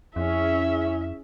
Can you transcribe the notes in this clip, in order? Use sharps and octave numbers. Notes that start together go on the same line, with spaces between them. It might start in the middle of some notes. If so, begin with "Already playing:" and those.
F2 C#4 E4 G#4 E5